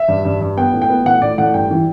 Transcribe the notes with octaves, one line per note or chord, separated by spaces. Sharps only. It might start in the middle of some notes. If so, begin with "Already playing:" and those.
Already playing: E5
G2
G2
G2
B3 G5
A2
G5
B3
A2 F#5
A2 D5
A2 F#5
G2 G5
E3